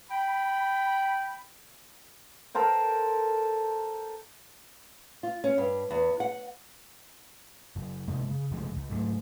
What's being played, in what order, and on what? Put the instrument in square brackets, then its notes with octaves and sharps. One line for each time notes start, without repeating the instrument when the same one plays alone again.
[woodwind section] G5 B5
[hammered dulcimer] A4 A#4 C5 G5
[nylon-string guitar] F4
C#4
G2
E2
F#5
[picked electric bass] F#1 F#2
F#2 C3 G#3 A#3
C#3
F#2 C#3 F3 G#3
C#2
G#2 F#3 A3